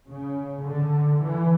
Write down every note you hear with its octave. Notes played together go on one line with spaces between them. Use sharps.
C#3
D3
E3